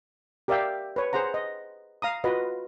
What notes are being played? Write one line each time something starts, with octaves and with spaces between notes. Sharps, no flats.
G4 A#4 D5 E5 F5 G5
B4 C#5
G#4 C5 F#5 A#5
D#5
F5 A#5 D#6
F4 F#4 B4 D#5